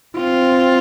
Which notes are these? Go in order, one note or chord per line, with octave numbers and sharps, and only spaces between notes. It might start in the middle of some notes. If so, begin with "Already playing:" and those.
C4 F4